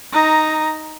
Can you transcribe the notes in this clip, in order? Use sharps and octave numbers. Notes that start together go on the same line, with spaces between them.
D#4 A#5